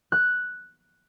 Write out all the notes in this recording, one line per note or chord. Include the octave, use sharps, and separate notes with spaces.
F#6